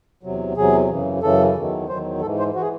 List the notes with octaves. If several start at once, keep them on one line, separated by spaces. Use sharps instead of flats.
E2 C3 F#3
E2 C3 F#3 G#4
F#2 C#3 E3
F#2 C#3 E3 A4
E2 D#3 F#3
E2 D#3 F#3 C5
G#2 E3 A4
C5
E3 F#4
G#4